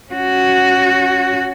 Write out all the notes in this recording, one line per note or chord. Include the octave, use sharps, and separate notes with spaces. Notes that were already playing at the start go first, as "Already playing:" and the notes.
C#4 F#4